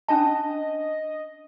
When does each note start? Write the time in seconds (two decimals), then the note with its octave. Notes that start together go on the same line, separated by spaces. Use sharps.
0.08 C#4 D4 D#5 A5